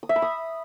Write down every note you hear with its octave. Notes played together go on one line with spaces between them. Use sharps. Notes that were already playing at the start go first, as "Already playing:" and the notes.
D#6
E5
B5
D#6